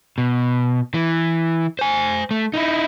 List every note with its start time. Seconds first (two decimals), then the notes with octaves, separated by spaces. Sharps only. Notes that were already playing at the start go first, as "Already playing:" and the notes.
0.18 B2
0.94 E3
1.79 C5 G#5
2.31 A3
2.54 D#4 E4